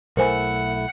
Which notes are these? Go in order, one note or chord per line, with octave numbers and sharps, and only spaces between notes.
B1 A3 E4 A#4 C5 F#5 G#5